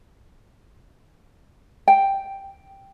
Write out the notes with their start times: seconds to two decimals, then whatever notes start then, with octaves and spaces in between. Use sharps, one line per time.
1.88 G5